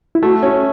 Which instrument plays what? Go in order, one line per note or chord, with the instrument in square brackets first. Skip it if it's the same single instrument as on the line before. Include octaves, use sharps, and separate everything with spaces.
[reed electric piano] E4
[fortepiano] A3 [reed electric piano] F#4
[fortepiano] C#4